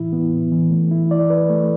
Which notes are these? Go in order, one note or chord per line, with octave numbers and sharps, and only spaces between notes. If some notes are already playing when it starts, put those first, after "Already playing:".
Already playing: A2 E3 E4
B3
A2
E3
A3
E4
D5
B4
A3